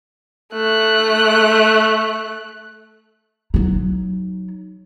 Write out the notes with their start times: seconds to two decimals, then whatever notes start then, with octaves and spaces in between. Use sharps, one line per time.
0.53 A3 F#6
3.54 F#3 D#4